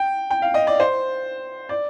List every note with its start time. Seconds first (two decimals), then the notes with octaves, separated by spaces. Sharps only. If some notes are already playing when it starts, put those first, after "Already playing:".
Already playing: G5
0.31 G5
0.42 F5
0.54 D#5
0.67 D5
0.80 C5
1.69 D5